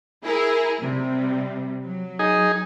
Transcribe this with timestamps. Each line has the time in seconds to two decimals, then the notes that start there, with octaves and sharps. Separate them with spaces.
0.24 E4 G#4 A#4
0.80 C3 G3
1.84 F#3
2.19 D#4 G#4